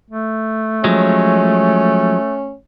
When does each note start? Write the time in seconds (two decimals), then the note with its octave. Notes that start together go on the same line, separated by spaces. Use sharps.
0.10 A3
0.84 F3 F#3 G#3 C#4